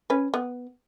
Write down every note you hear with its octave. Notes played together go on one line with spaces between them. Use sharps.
C#4 B4
B3